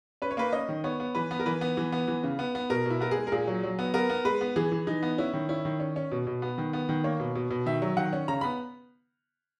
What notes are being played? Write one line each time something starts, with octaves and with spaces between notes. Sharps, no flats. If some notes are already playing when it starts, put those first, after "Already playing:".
C#4 B4
C#5
A#3 B4
C#4 D#5
D#3
B3 C#5
B3
E3 B4
B3
A#4
E3 B4
B3
E3
B3
E3
C#3
B3
B3
B2 A#4
B2 E4
B3 A#4
G#4
G#3
A#4
A#2 G#4
F#3
F#3
B3
B3 A#4
B3
G#3 B4
B3
E3 G#4
E3
E3 D#4
B3
C#4 E4
D#3
C#4 E4
D#3
C#4
C#4
B2
B2
B3
D#3
B3
D#3
A#3 C#5
B2
B2
B2
D#3 E5
F#3
D#3 F#5
C#4
C#3 A#5
B3 B5